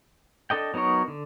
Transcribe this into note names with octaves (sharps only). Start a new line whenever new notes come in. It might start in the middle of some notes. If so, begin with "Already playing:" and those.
D4 A4 D#5 G5
F#3 B3 D#4 A#4 C#5
D3